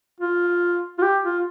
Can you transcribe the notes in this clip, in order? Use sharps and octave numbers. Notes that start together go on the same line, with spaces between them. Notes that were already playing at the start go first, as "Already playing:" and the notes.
F4
F4
G4
F4